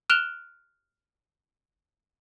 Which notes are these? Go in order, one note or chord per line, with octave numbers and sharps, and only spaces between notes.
F6 F#6 D7 E7 F7 G7